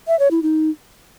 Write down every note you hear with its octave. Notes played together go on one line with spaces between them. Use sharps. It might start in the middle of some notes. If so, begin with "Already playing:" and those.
E5
C#5
E4
D#4